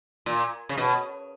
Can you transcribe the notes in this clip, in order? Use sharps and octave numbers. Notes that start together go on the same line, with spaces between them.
A#2
C#3
B2